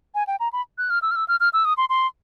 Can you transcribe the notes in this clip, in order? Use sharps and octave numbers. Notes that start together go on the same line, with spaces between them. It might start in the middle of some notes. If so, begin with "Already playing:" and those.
G#5
G5
A#5
B5
F#6
F6
E6
F6
E6
F6
F6
E6
D#6
C6
C6